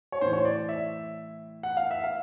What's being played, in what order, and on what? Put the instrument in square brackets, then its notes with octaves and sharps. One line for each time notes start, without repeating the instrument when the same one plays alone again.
[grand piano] C#5
A2 E3 C5
C#5
D5
E5
F#5
F5
E5
F5